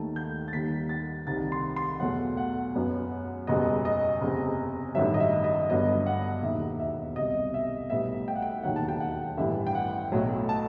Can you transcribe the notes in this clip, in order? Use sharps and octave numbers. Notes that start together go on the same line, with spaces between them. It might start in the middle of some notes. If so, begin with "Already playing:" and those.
Already playing: D#2 D#3 A3 A5
G6
A6
D#2 D#3 G3 B6
A6
C2 C3 D#3 A6
C6
C6
E2 B2 F#3 A3 F#5
F#5
F#2 F#3 B3
F#1 E2 B2 G3 B3 D#5
D#5
F#1 E2 C3
A1 G2 D#3 F#3 E5
D#5
E5
D#5
G1 G2 F#3 B3 D#5
F#5
E1 D#2 D#3 E5
E5
C2 B2 G3 D#5
E5
B1 A2 G3 B3 E5
G5
F#5
G5
E1 D#2 D#3 F#3 F#5
A5
G5
F#5
A1 G2 E3 G3 E5
G5
F#5
B1 A2 F#3 A3
A5